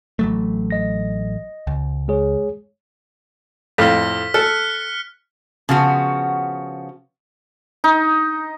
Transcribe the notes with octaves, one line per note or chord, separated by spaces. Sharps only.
A1 F#3 A3
D#5 A#6
C#2
G#3 G#4 C#5
F2 A2 F5 F6 B6
A4 F6 F#6 C#7
C#3 F3 B3 F#4
D#4